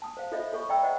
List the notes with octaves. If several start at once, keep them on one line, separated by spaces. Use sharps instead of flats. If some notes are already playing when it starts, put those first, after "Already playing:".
A5 D#6
C5 F5
F4 A4 C5 C#5 D#5 E5
F4 A4 C#5 C#6
D5 E5 G5 A#5 B5 E6
C5 D5 D#5 F#5 A#5